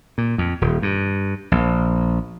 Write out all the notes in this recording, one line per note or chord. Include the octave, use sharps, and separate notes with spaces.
A#2
F2
D#1
G2
A#1